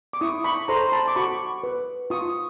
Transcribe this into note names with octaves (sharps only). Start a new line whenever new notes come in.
D6
E4 C#6 D#6
B5 C#6
A4 C5 A#5 C6
C6
A5 B5
D6
F#4 B5 C#6
B4
F4 C#6 D#6